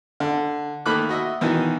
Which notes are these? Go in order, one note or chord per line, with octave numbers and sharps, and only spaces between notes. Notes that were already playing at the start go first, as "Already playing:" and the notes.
D3
D#3 A3 A#3 B5 D6 F#6
F#4 D#5 E5
B2 D#3 E3 D#4